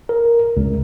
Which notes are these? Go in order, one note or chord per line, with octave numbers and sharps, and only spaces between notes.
A#4
C#2